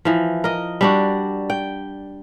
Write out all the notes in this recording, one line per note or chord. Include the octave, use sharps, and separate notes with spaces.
E3 F3
A#4 D#5
G3 D4 F#4
G5